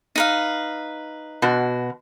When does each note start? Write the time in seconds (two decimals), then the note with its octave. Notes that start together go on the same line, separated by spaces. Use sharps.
0.16 D#4 B4 F5
1.42 B2 F#4